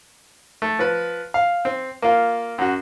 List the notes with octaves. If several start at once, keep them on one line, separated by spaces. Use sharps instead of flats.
A3
F3 B4
F5
C4
A#3 F4
F#2 F#4